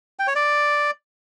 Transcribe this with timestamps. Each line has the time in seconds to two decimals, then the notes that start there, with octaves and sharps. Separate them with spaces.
0.19 G5
0.27 C#5
0.35 D5